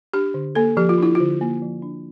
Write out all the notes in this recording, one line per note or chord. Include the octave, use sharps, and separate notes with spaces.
D4 G4
D3
A#3 A4
F3 G4
F4
D4 E4
D3 F4
A#3
F3
D4